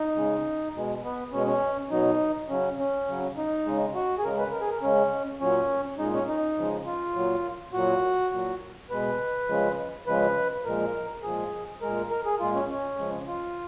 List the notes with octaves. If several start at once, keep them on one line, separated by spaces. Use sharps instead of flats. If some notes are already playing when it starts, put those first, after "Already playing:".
Already playing: D#4
C#3 G#3
B2 G#3
B3
B2 G#3 C#4
C#4
B2 F#3 D#4
C#3 F#3 C#4
C#4
C#3 F#3
D#4
C#3 G#3
F#4
G#4
C#3 G#3 A#4
B4
A#4
G#4
A#4
C#3 G#3 C#4
A#2 F#3 C#4
A#2 G#3 D#4
C#4
D#4
C#3 F3 G#3
F4
A#2 F#3
A#2 F#3 F#4
A#2 F#3
B2 G#3 B4
C#3 F3 G#3
C#3 F3 G#3 B4
A#2 F3 G#3 A#4
A#2 F3 G#3 G#4
A#2 G#3 A#4
A#4
G#4
A#2 G#3 F4
C#4
C#4
C#3 F3 G#3
F4